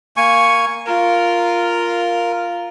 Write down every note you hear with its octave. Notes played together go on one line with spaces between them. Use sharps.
A#3 G#5 C#6
F4 A#4 F5